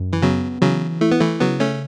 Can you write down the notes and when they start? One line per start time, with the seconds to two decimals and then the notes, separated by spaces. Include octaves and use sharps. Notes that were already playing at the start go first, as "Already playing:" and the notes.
Already playing: F#2
0.13 E3
0.22 C#3 F#3 B3
0.61 C#3 E3 F#3
1.01 A3 E4
1.12 B3
1.20 E3 A3
1.41 C#3 F#3 B3
1.60 A3 C#4